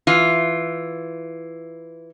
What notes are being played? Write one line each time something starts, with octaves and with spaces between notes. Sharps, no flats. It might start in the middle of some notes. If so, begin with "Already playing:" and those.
E3 F4